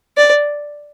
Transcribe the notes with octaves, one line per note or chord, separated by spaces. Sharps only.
D5